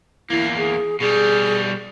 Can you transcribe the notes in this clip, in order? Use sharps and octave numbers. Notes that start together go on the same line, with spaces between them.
E2 A#3 E4
G#4
B2 G3 G#4